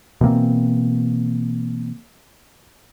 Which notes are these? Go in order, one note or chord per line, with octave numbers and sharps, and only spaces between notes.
B2 E3 A#3 C4